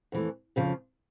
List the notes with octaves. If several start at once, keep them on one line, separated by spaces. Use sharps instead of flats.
F2 E3 A3
F2 C#3 F3